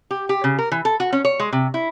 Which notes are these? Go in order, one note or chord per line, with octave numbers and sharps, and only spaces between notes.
G4
G4
C#3
A#4
E3
A4
F#4
C#4
C#5
G#3
C3
E4